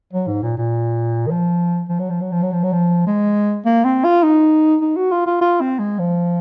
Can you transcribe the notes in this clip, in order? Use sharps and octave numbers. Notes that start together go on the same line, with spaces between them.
F#3
G#2
A#2
A#2
D#3
F3
F3
F#3
F3
F#3
F3
F#3
F3
F#3
F3
G#3
A#3
C4
F4
D#4
D#4
F#4
F4
F4
F4
C4
G#3
F3